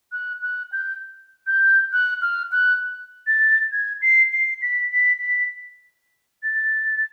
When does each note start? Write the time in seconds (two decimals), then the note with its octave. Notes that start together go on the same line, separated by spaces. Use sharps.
0.12 F#6
0.42 F#6
0.72 G6
1.47 G6
1.93 F#6
2.22 F6
2.52 F#6
3.27 A6
3.72 G#6
4.02 C7
4.33 C7
4.62 B6
4.92 B6
5.22 B6
6.43 A6